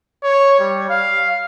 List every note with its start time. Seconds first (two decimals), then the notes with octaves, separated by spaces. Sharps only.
0.23 C#5
0.59 G3
0.90 F5